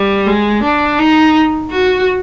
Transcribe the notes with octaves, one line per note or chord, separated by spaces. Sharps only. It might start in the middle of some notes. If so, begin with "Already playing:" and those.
Already playing: G3
G#3
D4
D#4
F#4